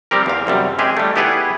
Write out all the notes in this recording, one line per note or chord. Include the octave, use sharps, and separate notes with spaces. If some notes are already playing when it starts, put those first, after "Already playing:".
G3 C4 G4 A#4
E2 F5
F#2 C3 G3
G#3 C4 G4 G#4
G3 A3
B3 E4 G4 G#4 B4 F#5